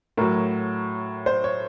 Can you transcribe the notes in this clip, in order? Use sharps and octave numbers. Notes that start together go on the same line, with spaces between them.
A2 F#3 A#4
C5
C#5